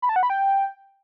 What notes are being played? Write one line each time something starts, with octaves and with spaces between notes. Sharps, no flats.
B5
A5
F#5
B5
G5